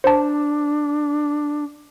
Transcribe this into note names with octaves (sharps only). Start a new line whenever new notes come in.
D4 C5 A5